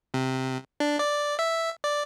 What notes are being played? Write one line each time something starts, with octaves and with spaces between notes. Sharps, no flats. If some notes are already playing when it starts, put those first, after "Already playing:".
C3
D4
D5
E5
D5